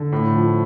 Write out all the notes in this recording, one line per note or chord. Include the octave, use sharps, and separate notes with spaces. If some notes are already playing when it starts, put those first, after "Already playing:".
Already playing: D3
A2
F3